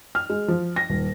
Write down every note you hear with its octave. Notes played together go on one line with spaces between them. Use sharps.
F6
G#3
F3
A#6
D#1